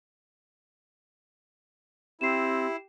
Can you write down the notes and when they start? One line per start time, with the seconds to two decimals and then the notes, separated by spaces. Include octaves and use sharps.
2.21 C4 E4 G4 C7 E7